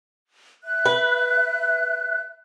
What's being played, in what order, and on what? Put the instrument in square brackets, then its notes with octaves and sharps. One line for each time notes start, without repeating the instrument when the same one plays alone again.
[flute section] E5 F#6
[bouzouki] B4